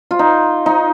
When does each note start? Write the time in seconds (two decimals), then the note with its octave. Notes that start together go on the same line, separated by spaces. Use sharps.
0.11 F4
0.19 D#4
0.66 D#4